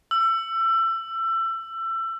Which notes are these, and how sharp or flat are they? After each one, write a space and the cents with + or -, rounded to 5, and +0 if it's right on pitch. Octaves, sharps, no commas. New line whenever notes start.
E6 +25